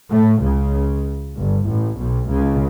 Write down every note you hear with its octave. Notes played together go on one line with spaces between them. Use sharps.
A2 A3
C#2 C#3
G1 G2
A1 A2
B1 B2
C#2 C#3